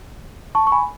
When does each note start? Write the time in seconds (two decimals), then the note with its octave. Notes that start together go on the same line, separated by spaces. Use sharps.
0.55 A5 C#6
0.67 C#6
0.72 G#5 B5